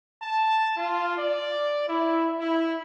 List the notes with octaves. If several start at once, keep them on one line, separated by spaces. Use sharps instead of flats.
A5
F4
D5
E4
E4